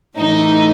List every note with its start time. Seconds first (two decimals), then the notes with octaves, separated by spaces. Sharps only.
0.16 A2 E3 D#4